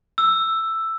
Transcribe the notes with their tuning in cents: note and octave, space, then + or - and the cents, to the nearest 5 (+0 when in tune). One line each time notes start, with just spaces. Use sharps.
E6 +5